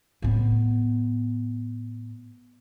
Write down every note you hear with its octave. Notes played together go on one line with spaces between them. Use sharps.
A2 B3